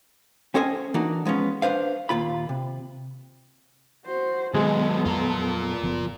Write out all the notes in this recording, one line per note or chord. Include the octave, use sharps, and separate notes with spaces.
C4 C#4 A4 C5 D#5 G#5
E3 A#3 D4 D#4 F#4
F3 G#3 B3 C#4
D4 B4 C5 F5
D#2 A#2 F4 B5
C3
F#4 C5
D#3 F#3 G#3 B3 A4
F2 F#3 F4 A#4
F#1 F3 B3